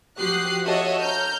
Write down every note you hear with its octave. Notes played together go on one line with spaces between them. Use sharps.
F3 F#4 G4 D#6 F#6 C7
F#4 A4 C#5 D#5 E5
A#5 F6 G6